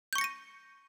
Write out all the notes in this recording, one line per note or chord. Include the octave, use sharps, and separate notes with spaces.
C#6 G6 A#6 C#7 D#7